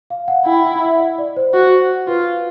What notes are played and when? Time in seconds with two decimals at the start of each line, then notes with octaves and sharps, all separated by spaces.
0.10 F5
0.28 F#5
0.46 E4 G5
0.64 F#5
0.82 E5
1.00 D#5
1.18 D5
1.37 C5
1.54 F#4
2.08 F4 B4